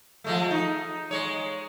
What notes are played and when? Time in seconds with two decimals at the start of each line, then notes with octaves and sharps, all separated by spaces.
0.24 F3 G#3 A3
0.51 D#4
1.11 G#3 C#5